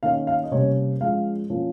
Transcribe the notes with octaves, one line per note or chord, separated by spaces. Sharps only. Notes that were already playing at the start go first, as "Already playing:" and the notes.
D#3 A#3 C#4 F5
F5
D#5
C3 G3 A#3 C#4 C#5
F3 G#3 C#4 F5
F3 A#3 C#4